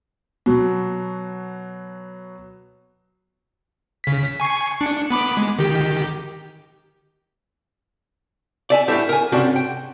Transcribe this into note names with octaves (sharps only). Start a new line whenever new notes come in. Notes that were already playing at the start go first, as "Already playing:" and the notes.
B2 F#3
C#3 B6
G#5 C#6 C7
D4 C#7
B3 B5 D6
G#3
D#3 G4
D5 E5 G#5
A2 G3 A3 B3 D4 E5
A#4 G#5
G#2 C3 C#4 D4 F#4 G4
G5